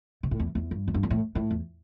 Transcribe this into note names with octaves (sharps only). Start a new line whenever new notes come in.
C3
A2
E2
E2
G2
E2
G2
E2
A2
A2
E2